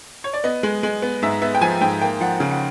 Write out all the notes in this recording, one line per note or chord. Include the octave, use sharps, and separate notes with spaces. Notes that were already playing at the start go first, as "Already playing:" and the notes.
C#5
D5
B3 D#5
G#3
G#3
B3
G#2 E5
B3 E5
G5
F3 G#5
G#2 G5
A#3 G5
F3 F#5
C#3
F#5